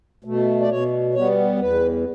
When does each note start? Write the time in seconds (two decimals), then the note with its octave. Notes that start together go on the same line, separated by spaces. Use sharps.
0.24 B2 A3
0.61 D5
0.70 B2 C#5
1.14 G3 B3 C#5
1.60 E2 B4